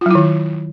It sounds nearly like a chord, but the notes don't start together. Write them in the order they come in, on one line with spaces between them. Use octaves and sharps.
F4 F#3 E4 D#3